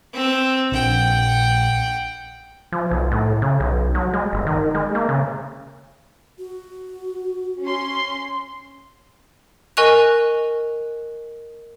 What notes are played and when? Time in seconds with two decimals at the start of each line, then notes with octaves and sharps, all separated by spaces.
0.13 C4 E6
0.72 A#1 D4 F#5 G5
2.72 F3
2.91 B1
3.11 A2
3.42 C#3
3.60 B1
3.95 F#3
4.13 G#3
4.33 G1
4.47 D#3
4.74 G#3
4.95 A#3
5.09 C#3
6.39 F#4
7.63 C#4 C6
9.77 A#4 D#5 G#5 C#6 F#6 F7